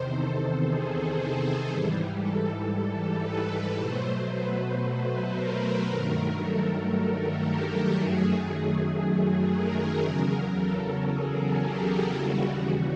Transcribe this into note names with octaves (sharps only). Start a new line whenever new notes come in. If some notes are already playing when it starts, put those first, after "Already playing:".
Already playing: E2 C3 D#3 C5
A4
G#4
G#2 E3 G3
A4
B4
B2 F#3 A3 C5
B4
A#4
G2 D#3 F#3 A3
A4
G4
F#2 D#3 F#3 A3 G#4
A#4
E2 C#3 F#3
A4
G#4
G4
D#2 C#3 E3 G3 F#4